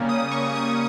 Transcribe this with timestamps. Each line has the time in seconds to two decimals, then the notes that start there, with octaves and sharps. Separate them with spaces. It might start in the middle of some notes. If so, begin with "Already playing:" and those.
Already playing: C#3 G3 A#3 C#4
0.09 D#6
0.32 C#6
0.55 D#6